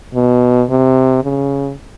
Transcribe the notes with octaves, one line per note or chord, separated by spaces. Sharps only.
B2
C3
C#3